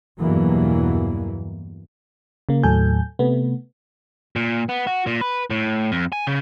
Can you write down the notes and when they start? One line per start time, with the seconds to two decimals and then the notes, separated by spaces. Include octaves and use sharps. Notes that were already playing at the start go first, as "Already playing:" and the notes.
0.20 E2 G2 B2 E3 F#3 A#3
2.49 C#3 A#3
2.63 D#2 A2 F#3 A4 G#5 G6
3.19 C3 A3 B3
4.36 A#2
4.69 B3
4.87 F#4
5.07 A#2
5.21 B4
5.50 A2
5.92 F2
6.12 G#5
6.27 C#3